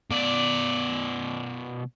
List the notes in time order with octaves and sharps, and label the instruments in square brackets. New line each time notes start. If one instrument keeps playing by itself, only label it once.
[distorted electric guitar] B2 D5